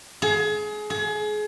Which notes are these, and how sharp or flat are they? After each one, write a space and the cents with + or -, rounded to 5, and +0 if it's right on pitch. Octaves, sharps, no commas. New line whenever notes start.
G#4 +25
G#4 +30